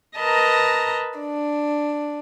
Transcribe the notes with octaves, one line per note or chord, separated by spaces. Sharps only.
A#4 B4 D#5 A5 A#5
D4